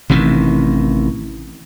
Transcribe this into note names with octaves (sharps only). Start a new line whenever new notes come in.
A1 C3 D#3 E3